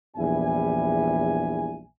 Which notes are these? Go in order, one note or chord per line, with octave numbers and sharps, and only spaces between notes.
A#1 E2 G3 E4 E5 G#5